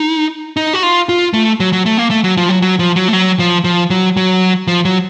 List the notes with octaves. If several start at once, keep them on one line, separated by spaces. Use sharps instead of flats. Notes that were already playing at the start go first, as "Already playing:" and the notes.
Already playing: D#4
D#4
F#4
F4
F4
A3
F#3
F#3
A3
A#3
A3
F#3
F3
F#3
F#3
F3
F#3
A3
F#3
F3
F3
F#3
F#3
F3
F#3